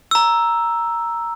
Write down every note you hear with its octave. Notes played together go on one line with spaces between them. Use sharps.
A#5 E6